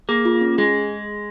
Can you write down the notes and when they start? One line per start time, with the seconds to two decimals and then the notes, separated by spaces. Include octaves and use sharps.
0.09 A#3 G#4
0.25 F4
0.41 C#4
0.58 G#3 G#4